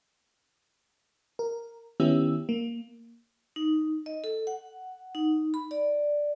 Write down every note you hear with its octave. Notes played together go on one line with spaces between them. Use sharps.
A#4
D#3 B3 C#4 E4 G4 E6
A#3
D#4
D#5
A4
F#5
D#4
B5
D5